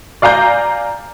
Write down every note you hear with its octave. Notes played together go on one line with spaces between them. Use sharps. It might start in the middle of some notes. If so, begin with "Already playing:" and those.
D5 F5 G#5 A#5 G6